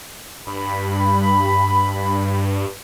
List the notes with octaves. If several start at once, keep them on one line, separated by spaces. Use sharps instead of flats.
G2 B5